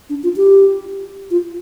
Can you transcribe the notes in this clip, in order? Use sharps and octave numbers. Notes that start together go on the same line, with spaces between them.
D4
F4
G4
F4